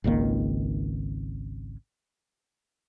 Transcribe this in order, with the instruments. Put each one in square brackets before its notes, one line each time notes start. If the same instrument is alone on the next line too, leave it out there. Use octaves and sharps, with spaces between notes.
[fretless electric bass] G#1 C#2 D#3 A#3